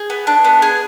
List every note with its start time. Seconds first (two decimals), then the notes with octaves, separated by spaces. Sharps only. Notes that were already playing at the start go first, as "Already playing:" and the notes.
Already playing: G#4
0.10 B3
0.27 D4
0.44 B3
0.62 G#4